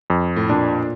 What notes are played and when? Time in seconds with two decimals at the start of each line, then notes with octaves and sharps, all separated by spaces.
0.10 F2
0.36 A2
0.49 A#2 D4